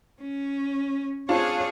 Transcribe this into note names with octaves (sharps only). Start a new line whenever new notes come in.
C#4
C4 D4 F4 G#4 C#5